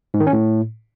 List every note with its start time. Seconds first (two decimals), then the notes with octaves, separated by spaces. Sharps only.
0.14 G#2
0.20 D#3
0.27 C#4
0.33 A2